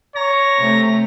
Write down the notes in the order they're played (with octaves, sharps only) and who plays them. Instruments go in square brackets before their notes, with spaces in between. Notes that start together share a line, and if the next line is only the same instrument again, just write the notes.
[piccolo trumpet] C#5 [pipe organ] A#5 A#6
[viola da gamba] C3 A3 C4